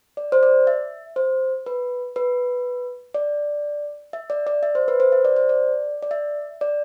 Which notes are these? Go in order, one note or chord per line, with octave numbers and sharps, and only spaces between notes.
D5
C5
D5
E5
C5
B4
B4
D5
E5
D5
D5
E5
C5
B4
C5
E5
D5
C5
D5
D5
E5
D5